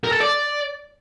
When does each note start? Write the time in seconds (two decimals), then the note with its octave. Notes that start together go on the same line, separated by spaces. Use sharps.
0.04 A#4
0.12 A4
0.21 D5